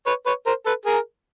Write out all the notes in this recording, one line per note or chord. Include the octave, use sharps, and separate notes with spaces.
B4 C#5
B4 C#5
A#4 C5
A4 B4
G#4 A#4